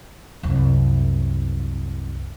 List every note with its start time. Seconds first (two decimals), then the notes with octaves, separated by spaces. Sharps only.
0.43 C2 F#2